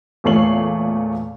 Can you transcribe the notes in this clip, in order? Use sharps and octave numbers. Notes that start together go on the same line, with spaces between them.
E2 A#2 A3 C#5 C7 F#7